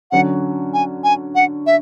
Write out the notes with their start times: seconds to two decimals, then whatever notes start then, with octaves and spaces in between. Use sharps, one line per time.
0.11 D3 F#3 C#4 F#4 F#5
0.74 G#5
1.04 G#5
1.35 F#5
1.66 E5